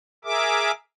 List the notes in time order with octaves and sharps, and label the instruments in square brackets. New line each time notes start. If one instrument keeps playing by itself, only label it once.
[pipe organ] G#4 A#4 E5 D6